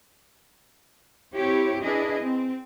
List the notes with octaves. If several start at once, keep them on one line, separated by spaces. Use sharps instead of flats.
C4 E4 G4 C#5
D4 E4 G#4 B4 D#5
C4